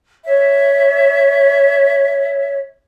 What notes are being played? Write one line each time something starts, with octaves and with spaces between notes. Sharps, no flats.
C#5 E5